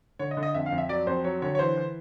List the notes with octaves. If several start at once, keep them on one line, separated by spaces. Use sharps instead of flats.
D3 C#5
D#5
D3
D#5
F2 E5
F5
F2
E5
F#3 D5
F2 C5
F#3 C#5
D3 C#5
C#5
E3 C5
E3